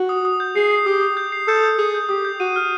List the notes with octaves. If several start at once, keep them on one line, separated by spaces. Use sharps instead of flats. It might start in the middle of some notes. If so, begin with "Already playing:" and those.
Already playing: F#4
D#6
D#6
G6
G#4 C7
C7
G4 D#6
D#6
G6
C7
A4 G6
G6
G#4 D#6
G6
G4 D#6
G6
F#4 D#7
F6